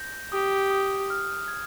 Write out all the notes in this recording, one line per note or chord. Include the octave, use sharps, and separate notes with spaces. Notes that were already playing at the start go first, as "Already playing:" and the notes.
Already playing: G6 A#6
G4 D#6
D#6
F6
G#6